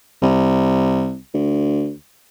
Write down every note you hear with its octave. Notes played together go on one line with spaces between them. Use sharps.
C2
D2